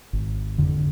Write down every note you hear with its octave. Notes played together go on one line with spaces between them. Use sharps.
G#1
F2 D3